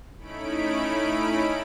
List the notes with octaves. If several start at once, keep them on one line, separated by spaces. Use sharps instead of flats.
A3 C#4 D#4 E4 B5 D7